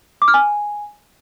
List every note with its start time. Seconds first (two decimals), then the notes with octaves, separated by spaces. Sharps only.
0.22 D6
0.28 F6
0.34 G#5